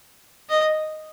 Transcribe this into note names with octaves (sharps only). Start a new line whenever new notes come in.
D#5